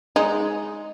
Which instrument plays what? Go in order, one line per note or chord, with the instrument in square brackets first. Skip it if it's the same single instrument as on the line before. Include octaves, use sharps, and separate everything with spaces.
[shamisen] G#3 D#4